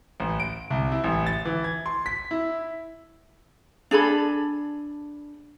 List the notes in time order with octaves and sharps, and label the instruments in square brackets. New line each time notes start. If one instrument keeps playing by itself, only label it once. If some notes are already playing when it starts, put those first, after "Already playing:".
[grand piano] A1
D7
C2
E4
A1
A6
E3
G#6
C6
B6
E4
[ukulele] D4 G#4 A4 B5